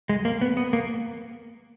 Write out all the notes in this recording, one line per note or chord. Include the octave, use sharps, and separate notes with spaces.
G#3
A#3
B3
B3
A#3